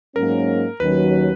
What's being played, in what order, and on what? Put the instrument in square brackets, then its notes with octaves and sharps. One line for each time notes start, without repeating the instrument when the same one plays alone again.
[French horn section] G#2 F#3 A#3 C#4 [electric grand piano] A#4
[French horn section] D#2 D#3 F#3 C#4 [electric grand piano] B4